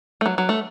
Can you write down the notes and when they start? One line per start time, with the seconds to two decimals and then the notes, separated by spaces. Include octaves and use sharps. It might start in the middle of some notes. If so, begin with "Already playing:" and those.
0.21 A3
0.26 F#3
0.38 F#3
0.49 A3